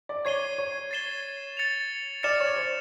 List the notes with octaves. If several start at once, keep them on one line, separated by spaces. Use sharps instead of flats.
D5
C#5 G#6 C7 D#7 G7
C#5
A6 C7 E7 G7
A6 C#7 F7
D5 F6 A6 C#7 E7
C#5
C5